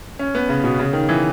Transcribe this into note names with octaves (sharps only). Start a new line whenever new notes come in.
C#4
B3
C#3
B2
C#3
D#3
E3